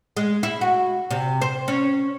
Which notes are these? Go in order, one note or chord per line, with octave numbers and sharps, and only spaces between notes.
G#3
E4
F#4
C3
C5
C#4